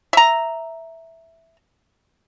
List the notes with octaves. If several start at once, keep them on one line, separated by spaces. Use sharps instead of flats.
E5 A#5